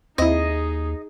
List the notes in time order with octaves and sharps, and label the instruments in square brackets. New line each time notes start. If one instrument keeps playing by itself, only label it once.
[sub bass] D#2 [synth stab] C4 E4 [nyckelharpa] D#4 G#4 [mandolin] D#5